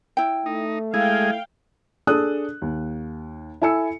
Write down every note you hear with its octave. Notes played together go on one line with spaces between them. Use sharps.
E4 G5
A3 D#4
G#3 E4 G#4 F5 G5
D4 G#4 A4 D#6 F#6
D#2
E4 A4 G#5 E6 C#7